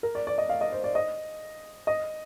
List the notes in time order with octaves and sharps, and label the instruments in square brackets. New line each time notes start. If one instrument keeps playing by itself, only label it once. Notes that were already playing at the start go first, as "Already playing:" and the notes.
[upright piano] A#4
D5
D5
D#5
F5
D#5
C5
D5
D#5
D#5